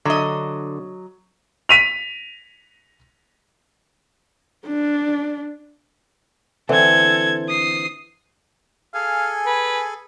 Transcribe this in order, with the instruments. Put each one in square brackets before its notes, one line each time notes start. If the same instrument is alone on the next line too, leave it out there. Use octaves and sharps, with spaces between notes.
[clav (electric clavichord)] D3 [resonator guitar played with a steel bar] F#3 D#5
[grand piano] B6 D#7 F7
[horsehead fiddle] D4
[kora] D3 E3 C4 [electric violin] A4 G#6
[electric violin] D#6 C7
[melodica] G#4 A4 G#5 [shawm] F5
[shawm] B4